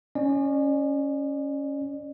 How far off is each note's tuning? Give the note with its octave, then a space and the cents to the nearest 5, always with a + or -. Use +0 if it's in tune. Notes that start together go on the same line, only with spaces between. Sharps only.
C#4 +0 D5 +40